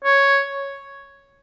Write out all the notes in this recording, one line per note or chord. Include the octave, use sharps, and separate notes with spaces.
C#5